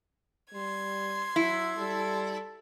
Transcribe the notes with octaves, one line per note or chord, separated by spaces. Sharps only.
G3 C6 G#6
F#3 E4
G3 A4